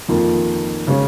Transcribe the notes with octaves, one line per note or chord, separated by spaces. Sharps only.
F2 D#3 A#3 F4
C#3 G#3 C#4